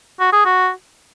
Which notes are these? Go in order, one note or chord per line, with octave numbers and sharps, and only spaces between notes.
F#4
G#4
F#4